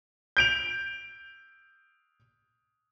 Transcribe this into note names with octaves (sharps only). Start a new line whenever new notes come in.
G6 D7 F7